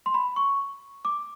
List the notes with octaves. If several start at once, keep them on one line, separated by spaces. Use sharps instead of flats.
C6
B5
C#6
D6